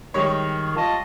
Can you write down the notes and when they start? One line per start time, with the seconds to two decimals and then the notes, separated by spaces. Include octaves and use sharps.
0.14 D#3 G3 G#3 C#5
0.76 F4 D#5 A5